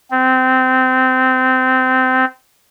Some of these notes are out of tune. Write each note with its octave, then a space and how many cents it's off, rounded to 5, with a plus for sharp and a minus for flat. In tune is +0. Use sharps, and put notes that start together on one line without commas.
C4 -20